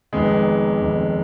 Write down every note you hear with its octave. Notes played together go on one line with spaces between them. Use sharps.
F1 F2 D#3 G#3 B3
F1 F2 D#3